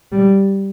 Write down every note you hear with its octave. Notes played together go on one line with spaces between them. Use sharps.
G3